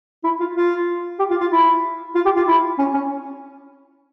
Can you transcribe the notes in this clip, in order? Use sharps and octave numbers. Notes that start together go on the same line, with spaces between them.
E4
F4
F4
G4
F4
F4
E4
F4
G4
F4
E4
C#4
C#4